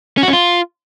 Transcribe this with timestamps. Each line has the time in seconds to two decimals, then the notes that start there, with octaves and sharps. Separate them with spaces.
0.18 C#4
0.23 F#4
0.28 C#4
0.33 F4